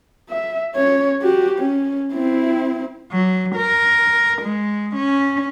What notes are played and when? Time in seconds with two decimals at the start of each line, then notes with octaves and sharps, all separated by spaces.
0.30 E5
0.76 C#4 C#5
1.22 F#4 G4
1.59 C#4
2.14 C4 E4
3.12 F#3
3.56 A#4
4.42 G#3
4.96 C#4